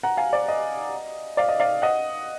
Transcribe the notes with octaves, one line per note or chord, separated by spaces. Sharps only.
F#5 A#5
F5 G#5
D5
D#5
D5 F5
D#5
D5 F5
D#5 F#5